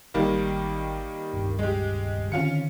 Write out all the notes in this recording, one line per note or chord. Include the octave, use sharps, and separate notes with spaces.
G#1 D#3 G3 A#3
D#1 C#2 G2
G#3 G4
D3 D#3 C4 C#4 F4 C#7